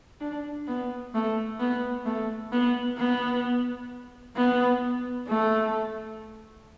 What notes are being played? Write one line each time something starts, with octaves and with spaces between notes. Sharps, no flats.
D4
B3
A3
B3
A3
B3
B3
B3
A3